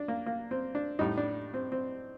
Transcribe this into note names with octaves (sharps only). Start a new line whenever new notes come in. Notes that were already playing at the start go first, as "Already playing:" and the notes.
Already playing: D4
A#3
A#3
C4
D4
A2 G3 D#4
D4
C4
C4